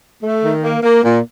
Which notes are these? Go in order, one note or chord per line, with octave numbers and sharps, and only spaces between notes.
A3
D#3
A#3
A#3
A#2